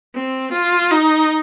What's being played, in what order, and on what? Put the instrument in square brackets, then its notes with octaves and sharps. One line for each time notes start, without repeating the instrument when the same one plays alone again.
[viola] C4
F4
D#4